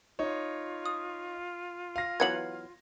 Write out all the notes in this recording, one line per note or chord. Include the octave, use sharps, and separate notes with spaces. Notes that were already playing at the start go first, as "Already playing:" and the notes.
D#4 F4 C#5
D#6
F5 A#6
E3 F#3 B3 G#6 C#7 F#7